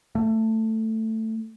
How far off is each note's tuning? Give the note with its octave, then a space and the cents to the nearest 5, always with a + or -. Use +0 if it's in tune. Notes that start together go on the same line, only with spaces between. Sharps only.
A3 +10